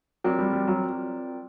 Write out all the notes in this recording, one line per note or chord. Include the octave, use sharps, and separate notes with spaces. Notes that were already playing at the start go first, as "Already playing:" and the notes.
F#3 C4 F4 A#4 D5 G5
G3
G3
F#3